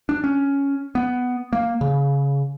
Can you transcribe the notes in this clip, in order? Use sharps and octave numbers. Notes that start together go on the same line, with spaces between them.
D4
C#4
B3
A#3
C#3